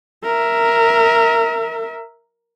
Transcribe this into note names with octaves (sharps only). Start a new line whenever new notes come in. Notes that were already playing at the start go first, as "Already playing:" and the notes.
A#4 E5